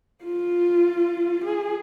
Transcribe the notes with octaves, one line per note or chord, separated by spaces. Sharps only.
F4
G#4